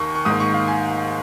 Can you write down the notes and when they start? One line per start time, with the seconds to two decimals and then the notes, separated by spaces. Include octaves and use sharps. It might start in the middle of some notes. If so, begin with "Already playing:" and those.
Already playing: D#2 D#3 A#3 C#6
0.15 C#6
0.25 G#2 D#3 A#3 D#6
0.40 C#6
0.54 F5
0.68 G#5